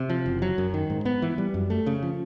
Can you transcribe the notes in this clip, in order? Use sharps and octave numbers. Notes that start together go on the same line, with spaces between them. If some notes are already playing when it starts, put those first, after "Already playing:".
Already playing: C3
F3
F#1
F#3
F#2
D#3
G#2
B3
E3
G3
F#2
A3
C#3
F3